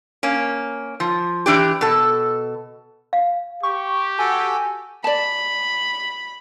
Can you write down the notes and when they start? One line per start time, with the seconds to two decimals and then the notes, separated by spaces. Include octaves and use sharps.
0.23 A#3 C#4
1.00 F3
1.46 E3 D4 G4
1.81 B2 A4
3.13 F5
3.63 G4 C#6
4.19 F#4 A4 G#5
5.04 D5 A5 B5